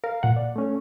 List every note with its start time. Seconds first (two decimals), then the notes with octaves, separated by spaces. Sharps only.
0.04 A#4 F5
0.23 A#2 F#5
0.36 D5
0.56 A3 C#4